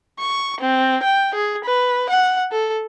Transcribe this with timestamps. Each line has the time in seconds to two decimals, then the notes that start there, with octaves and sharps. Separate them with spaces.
0.19 C#6
0.61 C4
1.03 G5
1.35 G#4
1.64 B4
2.10 F#5
2.52 A4